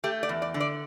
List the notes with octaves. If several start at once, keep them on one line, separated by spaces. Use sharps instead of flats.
A3 G4
D5
E2
D5
D3
D5